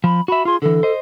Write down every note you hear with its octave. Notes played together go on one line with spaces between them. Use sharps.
F3 B5
F#4 E5 B5
F4 G#4 C6
D3 E3 A4
C5 D#5